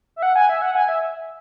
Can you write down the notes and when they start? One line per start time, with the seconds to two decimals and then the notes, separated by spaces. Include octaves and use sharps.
0.16 E5
0.23 F#5
0.36 G#5
0.49 E5
0.62 F#5
0.75 G#5
0.88 E5